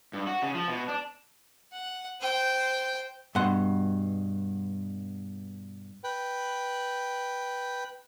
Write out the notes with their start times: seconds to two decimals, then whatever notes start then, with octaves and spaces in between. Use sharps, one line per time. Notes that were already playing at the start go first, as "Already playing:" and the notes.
0.13 G2
0.27 F#4
0.42 C#3
0.55 F3
0.68 B2
0.88 D4
1.72 F#5
2.21 C5 G5
3.35 G2 B2 F#5 C6
6.04 B4 G5